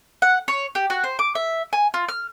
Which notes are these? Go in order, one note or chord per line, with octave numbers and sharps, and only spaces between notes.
F#5
C#5
G4
F#4
C5
D6
E5
G#5
F4
F6